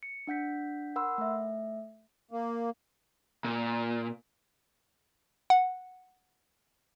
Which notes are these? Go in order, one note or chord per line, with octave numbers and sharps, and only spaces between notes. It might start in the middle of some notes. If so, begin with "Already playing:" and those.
C#7
D4 F#5 G6 B6
A#4 F#5 B5 C6 E6
A3 E5
A#3
A#2
F#5